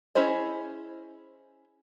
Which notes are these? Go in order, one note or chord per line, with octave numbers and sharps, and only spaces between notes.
C#4 E4 G#4 C5 D#5